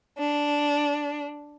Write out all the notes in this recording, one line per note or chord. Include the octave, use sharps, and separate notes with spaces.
D4